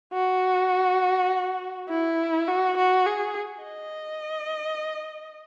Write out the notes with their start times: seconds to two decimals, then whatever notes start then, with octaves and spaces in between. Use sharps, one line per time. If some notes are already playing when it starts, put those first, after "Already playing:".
0.13 F#4
1.89 E4
2.48 F#4
2.77 F#4
3.06 G#4
3.64 D#5